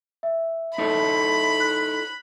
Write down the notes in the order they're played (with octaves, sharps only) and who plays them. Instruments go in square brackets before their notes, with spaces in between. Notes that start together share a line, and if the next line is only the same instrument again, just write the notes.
[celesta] E5
[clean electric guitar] D#4 E4 A4 [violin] B5
[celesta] F#6